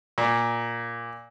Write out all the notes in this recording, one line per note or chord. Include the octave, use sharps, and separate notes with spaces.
A#2